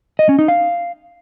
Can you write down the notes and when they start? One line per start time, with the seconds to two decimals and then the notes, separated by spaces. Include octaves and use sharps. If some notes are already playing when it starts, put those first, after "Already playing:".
0.19 D#5
0.29 C#4
0.39 D#4
0.48 F5